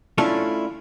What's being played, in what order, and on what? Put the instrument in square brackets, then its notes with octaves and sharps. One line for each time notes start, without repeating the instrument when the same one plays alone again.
[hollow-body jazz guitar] A3 C#4 D4 E4 F4 A4